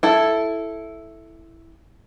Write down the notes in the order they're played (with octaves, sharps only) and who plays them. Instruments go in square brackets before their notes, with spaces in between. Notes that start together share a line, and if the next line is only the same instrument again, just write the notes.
[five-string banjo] E4 A4